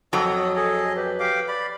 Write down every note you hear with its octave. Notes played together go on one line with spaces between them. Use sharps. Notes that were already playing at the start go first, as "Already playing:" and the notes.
F2 F#3 A4 D#5 D#6
C#5
G#4 A4 D#5
G4 B4
G4 F5 D6
D5 B5